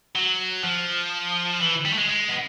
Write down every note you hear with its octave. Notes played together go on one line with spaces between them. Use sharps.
F#3
F3
E3
G3
A3
G#3
G#3
B3